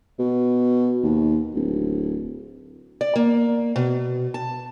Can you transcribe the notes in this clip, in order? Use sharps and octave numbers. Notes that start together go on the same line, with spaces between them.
B2
D#2
D1
D5
A#3
B2
A5